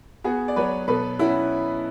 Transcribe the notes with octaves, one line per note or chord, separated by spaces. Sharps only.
B3 F#4 G#4
D5
F#3 B4 C#5
B2 A4 B4
C#4 E4 F#4